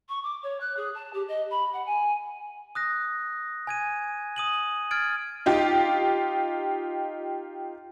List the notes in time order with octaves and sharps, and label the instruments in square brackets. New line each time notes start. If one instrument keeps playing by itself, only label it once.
[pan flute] C#6
D6
C#5
F#6
G#4
A5
G4
D#5
B5
F#5
G#5
[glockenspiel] D#6 F#6 A#6
G#5 G#6 D#7
D#6 D#7 F#7
F6 G#6 A6 D7
[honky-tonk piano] D#4 F4 G4